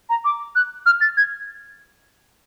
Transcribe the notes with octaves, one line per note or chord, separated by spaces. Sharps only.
A#5
D6
F#6
F6
A6
G#6